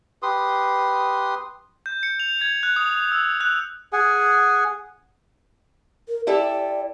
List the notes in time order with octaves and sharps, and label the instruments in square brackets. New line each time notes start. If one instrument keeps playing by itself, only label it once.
[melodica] G4 B4 C6 D#6
[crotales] G6
C#7
F7
G#6
F#6
D#6
E6
F#6
[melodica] G#4 F#5 G#5
[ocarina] A#4
[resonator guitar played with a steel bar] E4 G4 A4 [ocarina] D5